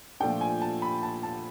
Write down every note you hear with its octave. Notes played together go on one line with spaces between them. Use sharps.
A#2 F3 A3 D4 G5
G#5
A5
B5
A5
A5